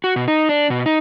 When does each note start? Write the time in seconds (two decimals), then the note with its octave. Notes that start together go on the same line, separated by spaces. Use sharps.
0.04 F#4
0.16 B2
0.28 D#4
0.49 D4
0.70 B2
0.86 D#4